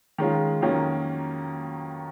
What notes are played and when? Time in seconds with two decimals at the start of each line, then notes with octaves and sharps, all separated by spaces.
0.18 D#3 G#3 C#4 F4
0.62 F2 D#3 F#3 A#3 C#4